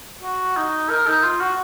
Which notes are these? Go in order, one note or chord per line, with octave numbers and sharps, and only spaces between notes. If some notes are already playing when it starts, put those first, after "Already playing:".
F#4
D#4
A#4
D#4
F4
F#4